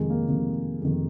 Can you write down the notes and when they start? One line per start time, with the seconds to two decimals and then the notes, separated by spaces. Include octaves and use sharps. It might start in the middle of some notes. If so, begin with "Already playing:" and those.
Already playing: F2 C3 D#3 G#3
0.10 A#3
0.28 F2 C3 D#3
0.82 F2 C3 D#3